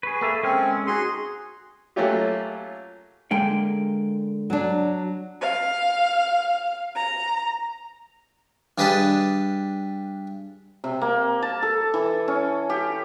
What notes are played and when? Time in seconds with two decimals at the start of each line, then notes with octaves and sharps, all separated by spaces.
0.03 G#4 B4 C#6
0.21 A#3 A4 E5
0.43 G#3 C4 C#4 G#4 F6
0.87 D#4 F#4 G#4 C6
1.96 F#3 A3 A#3 C#4 F4 G4
3.31 D3 G#3 A#3 G5
4.50 F#3 D4
5.40 F5
6.95 A#5
8.78 G2 D4 G#4 B4 D#5 A5
10.84 C3
11.01 A#3
11.42 A5
11.62 A4
11.94 E3
12.28 C#4
12.70 G4